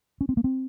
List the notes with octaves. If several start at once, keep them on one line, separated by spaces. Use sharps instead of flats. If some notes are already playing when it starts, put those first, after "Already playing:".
C#4
C4
A#3
C4